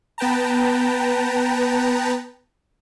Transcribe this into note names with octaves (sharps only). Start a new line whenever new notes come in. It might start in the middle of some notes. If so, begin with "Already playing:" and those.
B3 B4 G5 A5 A#5